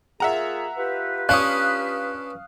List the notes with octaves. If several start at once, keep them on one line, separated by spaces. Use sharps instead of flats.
A#3 F4 G#4 E5 F#5 A#5
F4 G4 B4
C#4 D4 C#5 F5 D#6 F#6